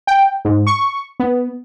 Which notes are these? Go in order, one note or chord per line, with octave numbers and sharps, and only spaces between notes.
G5
G#2
C#6
B3